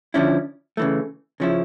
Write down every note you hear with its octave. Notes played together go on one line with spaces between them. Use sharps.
D3 F3 C#4 E4
C#3 E3 A3
C#3 F3 C#4 E4